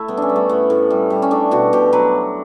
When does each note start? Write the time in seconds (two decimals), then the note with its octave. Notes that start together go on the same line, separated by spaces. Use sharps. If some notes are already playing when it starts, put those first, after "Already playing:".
Already playing: A3 E4
0.08 G3 B3
0.17 C#4 D4
0.29 G3
0.36 A3
0.49 A2 B3
0.70 A2
0.90 G3
1.10 G3
1.22 C#4
1.31 A3 D4
1.51 B2 F#4
1.73 B2 G4
1.93 F#3 B4